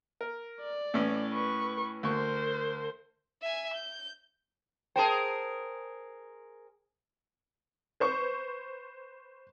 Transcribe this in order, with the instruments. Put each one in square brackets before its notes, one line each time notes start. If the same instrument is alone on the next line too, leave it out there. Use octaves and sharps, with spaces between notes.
[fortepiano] A#4
[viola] D5
[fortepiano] A2 E3 C#4
[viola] B4 C#6
[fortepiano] D2 C#6 [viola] A#4 C5
[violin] E5 G#5
G6
[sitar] G#4 A#4 C5 [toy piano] G5 A5
[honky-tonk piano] B4 C5 C#6